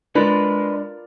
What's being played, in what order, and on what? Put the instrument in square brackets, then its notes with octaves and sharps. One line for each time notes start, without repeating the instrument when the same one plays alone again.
[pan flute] G#3 [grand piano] D4 [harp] F4 A#4 D5 [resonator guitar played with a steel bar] B4